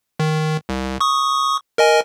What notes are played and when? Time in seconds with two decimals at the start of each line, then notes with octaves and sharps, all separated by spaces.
0.19 D#3
0.69 C2
1.00 C#6 D#6
1.78 A#4 D#5 G#5